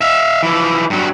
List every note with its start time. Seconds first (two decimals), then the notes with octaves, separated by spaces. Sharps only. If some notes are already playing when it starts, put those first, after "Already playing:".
0.01 E5 F5
0.43 E3 F3
0.90 G2 F#3